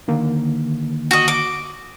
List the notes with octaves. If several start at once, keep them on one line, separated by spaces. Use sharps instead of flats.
D3 D#3 A#3
F#4 D#5
D6